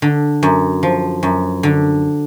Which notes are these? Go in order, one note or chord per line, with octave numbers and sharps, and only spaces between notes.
D3
F#2
F3
F#2
D3